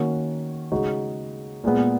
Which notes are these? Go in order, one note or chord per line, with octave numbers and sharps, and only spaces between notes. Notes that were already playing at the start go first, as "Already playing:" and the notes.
Already playing: D#3 A#3 C#4 F#4
C#3 G#3 D#4 F#4
A#2 G#3 B3